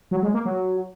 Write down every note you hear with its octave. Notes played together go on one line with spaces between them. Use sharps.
F#3
G#3
A#3
F#3